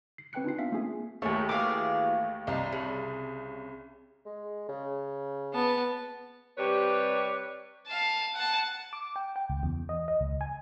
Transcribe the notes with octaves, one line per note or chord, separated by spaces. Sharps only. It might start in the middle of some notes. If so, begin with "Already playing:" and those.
C7
C4 B4 G5 G#5 F#6 C#7
D4 D#4 F4 C7
B3 D4 E5 F5 B6
A3 A#3 C4 F4 G#4 G#5
D#2 A3 A#3 E4 C#5
E3 F#4 G#4 F5 D6
C2 D4 D#4
C#3
G#3
C#3
B3 A5
C3 G3 G4 B4 C#5
F5 A5
F#5 A5
D6
G5
G5
C#2
E2
D#5
D#5
C#2
G#5